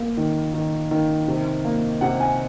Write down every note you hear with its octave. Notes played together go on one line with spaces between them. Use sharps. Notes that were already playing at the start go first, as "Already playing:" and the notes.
Already playing: A#3
D#3
D#3
D#3
C3
A#3
C3 F#5
G#5